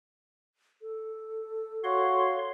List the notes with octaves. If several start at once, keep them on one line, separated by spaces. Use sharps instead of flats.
A4
F#4 C#5 F5 C6